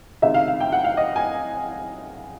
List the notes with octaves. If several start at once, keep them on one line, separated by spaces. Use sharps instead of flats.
C#2 C3 D#3 E5
F5
F5
G5
F#5
F5
D#5
G#5